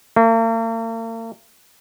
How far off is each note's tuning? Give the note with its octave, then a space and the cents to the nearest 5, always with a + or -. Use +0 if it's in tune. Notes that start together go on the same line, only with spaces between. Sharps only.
A#3 -45